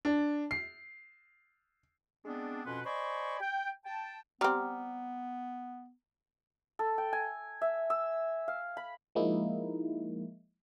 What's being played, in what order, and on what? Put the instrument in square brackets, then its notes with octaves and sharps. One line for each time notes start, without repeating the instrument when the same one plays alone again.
[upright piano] D4
C7
[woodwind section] G#3 B3 C4 D4
F2 B2 C#4 B4 F#5 C6
C5 D5 D#5 G#5 B5 C#6
G5
G5 A5
[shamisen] G3 C4 [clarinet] B3 [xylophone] A#5 D6 F6
[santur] A4
G5
G#5
E5
E6
F5
B5
[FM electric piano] F3 G#3 A#3 D#4 E4